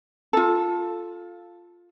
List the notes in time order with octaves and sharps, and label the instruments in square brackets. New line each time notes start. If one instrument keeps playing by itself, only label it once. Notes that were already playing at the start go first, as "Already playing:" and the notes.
[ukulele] F4 A4